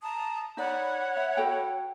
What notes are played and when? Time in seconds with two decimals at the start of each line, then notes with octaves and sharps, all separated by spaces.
0.02 A5 A#5 D#6
0.57 D#4 C#5 D5 F#5 B5
1.17 E5
1.37 F#4 A4 G5